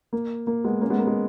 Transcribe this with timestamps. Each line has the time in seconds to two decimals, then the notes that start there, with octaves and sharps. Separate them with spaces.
0.13 A#3
0.47 A#3
0.64 G#3 B3
0.81 A#3 C#4
0.90 G#3 B3
0.99 A#3
1.07 G#3